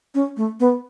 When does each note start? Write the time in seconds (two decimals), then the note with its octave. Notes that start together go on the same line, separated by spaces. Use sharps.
0.15 C#4
0.37 A3
0.60 B3